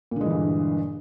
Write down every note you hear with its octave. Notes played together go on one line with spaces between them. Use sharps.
G2 A#2 D3 E3 G#3